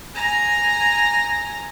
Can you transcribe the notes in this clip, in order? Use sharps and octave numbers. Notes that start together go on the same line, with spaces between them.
G#5 A#5